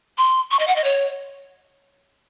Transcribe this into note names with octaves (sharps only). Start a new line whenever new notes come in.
C6
C#6
D#5
F#5
D#5
C#5